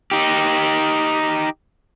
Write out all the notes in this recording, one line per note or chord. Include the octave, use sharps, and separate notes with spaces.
D#4 G4